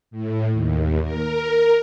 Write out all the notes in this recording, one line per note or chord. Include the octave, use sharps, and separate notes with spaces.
A2
D#2
A#4